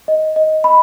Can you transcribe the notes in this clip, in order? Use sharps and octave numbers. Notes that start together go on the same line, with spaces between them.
D#5
D#5
B5